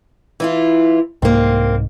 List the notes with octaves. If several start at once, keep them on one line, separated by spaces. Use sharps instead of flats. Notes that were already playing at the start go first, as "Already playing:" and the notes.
E3 E4 F4
C2 G#2 A#3 C4